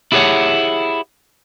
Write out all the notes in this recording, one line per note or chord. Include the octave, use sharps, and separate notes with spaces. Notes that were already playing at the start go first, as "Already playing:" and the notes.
E4 G4 G#4 B4 C#5 F#5